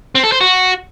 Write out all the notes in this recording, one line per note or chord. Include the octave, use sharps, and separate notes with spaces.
C4
A4
C5
F#4